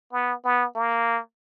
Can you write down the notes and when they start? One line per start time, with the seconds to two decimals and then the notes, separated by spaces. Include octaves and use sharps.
0.12 B3
0.44 B3
0.75 A#3